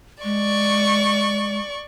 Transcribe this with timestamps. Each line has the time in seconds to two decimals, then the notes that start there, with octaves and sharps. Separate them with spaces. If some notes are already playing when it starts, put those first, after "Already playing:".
0.24 G#3 D5 C#6